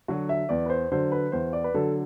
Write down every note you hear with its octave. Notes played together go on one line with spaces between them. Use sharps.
D3 F#3 F#4
E5
E2 D5
B4
C5
D3 F#3 C5
B4
E2 C5
D5
B4
D3 F#3 A4